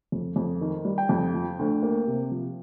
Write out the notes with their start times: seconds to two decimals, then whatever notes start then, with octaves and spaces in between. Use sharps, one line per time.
0.12 F2
0.36 F2
0.61 D#3
0.85 G3
0.98 G5
1.09 F2
1.34 F3
1.59 D2
1.83 A#3
2.07 C3
2.32 F3